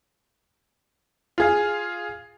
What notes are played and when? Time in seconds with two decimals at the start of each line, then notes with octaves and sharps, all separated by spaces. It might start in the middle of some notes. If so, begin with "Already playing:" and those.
1.38 F4 G#4 F5